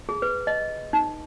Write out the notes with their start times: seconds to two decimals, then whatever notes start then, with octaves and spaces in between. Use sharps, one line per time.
0.09 G#4
0.22 B4
0.47 D#5
0.93 D#4